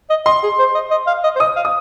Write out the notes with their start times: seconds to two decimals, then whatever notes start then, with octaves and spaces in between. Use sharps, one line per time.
0.10 D#5
0.26 D#5 C6
0.43 G#4
0.59 C5
0.74 D#5
0.91 D#5
1.07 F5
1.23 D#5
1.36 C5
1.40 D#5 D#6
1.56 F5
1.65 D#6